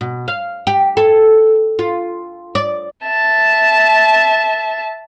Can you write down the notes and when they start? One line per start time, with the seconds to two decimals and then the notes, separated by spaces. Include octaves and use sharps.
0.01 B2
0.28 F5
0.67 G4
0.97 A4
1.79 F4
2.55 D5
3.07 E5 A5